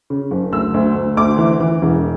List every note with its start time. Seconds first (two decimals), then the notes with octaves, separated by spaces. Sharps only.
0.10 C#3
0.31 F#1
0.52 D2 E6
0.74 D2
0.95 D2
1.17 D2 D6
1.38 E3
1.60 E3
1.82 E1